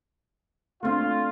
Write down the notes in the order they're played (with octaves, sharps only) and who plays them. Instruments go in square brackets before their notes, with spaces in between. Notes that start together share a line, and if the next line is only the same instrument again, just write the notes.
[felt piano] A3 C4 D4 [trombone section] F4